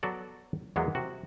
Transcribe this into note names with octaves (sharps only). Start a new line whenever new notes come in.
F#3 B3 F#4 A4 D5
E2 E3 F#3 G#3 A#3 B3
C3 F#4